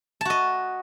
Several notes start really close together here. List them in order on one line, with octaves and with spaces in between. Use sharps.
A5 F#4 D#5